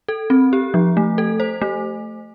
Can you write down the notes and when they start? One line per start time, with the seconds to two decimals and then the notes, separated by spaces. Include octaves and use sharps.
0.08 A4
0.30 C4
0.53 G4
0.74 F3
0.97 A3
1.18 A4
1.40 C5
1.62 A3